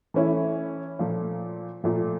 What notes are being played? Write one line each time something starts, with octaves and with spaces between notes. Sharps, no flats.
E3 A3 C#4 E4
A#2 F3 A3
A#2 F3 A3